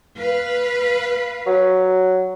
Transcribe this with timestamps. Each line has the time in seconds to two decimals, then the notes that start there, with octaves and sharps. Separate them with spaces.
0.18 B4 F5
1.46 F#3